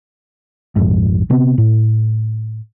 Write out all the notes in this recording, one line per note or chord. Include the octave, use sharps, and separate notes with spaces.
A#1 F2 G#2
C3 B3 C4
A2